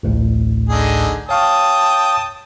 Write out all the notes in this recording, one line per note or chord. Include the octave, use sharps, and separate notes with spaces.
A1 D2 A2
D3 D#4 G#4
C#5 F5 G5 A5 C#6 D#6